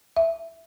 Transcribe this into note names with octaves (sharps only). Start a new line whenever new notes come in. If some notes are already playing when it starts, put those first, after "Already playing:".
E5